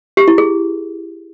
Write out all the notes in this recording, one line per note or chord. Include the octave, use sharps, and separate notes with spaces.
G4
E4
G#4